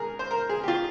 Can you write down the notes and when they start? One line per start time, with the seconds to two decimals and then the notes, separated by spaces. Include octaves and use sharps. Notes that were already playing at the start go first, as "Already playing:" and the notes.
Already playing: G#2 G#4 A#4
0.19 C5
0.31 A#4
0.49 G#4
0.63 G4
0.68 F4